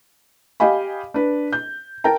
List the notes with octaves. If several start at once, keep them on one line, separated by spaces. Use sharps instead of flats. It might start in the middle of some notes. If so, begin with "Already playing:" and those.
G4 D#5 F5 G#5 B5
D4 B4
G6
A#4 G5 A5 A#5